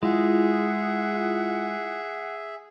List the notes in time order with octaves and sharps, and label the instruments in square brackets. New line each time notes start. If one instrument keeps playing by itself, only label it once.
[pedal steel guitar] G#3 [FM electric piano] E4 F4 [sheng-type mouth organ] G#4 E5 [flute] F#5